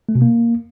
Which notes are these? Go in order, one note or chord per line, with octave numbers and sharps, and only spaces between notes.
A3
B2
A#3